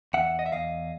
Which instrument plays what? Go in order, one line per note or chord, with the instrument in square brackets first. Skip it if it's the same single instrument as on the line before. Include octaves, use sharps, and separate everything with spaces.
[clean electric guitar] E2 E5 F#5
D#5
E5
E2 D#5 F5